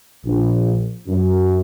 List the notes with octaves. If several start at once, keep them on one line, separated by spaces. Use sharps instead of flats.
A#1
F#2